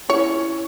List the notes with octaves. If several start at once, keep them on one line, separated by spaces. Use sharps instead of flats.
C#4 E4 C#5